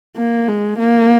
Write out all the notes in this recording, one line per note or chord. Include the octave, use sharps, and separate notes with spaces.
A#3
G#3
A#3